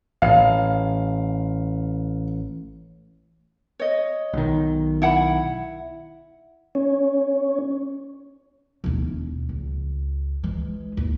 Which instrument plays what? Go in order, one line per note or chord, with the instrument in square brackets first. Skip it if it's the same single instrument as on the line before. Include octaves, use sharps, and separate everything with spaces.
[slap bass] A1 [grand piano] F5
[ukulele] C#5 D#5
[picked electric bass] B1 D#3
[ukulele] E4 F#5 B5
[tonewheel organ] C#4
[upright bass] E1 D#2
C#2
E3 G#3
D#2